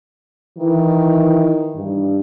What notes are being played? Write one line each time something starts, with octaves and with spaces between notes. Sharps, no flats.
D#3 E3
G2